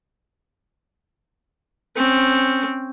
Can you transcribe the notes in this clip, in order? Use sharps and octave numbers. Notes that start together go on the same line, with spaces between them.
C4 C#4